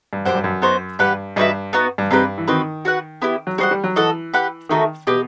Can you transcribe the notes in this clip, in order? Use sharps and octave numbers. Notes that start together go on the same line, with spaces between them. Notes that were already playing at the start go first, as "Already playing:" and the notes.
G2
F#2 G4 C5 F#5
G2
F#2
B3 D#4 F#4 C5
G2 G4 B4 F#5
G2 D#4 F#4 B4 E5
B3 D#4 F#4 B4
G2
G2 C4 D#4 G4 B4
E3
D#3 C4 F#4 B4 D#5
F#4 B4 F#5
B3 E4 G4
F#3
G3 F#4 C5 D#5 F#5
G3
F#3
E3 F#4 A4 D#5 F#5
G4 B4 F#5
D#3 A3 D#4 F#4 A4
B2 G4 B4 D#5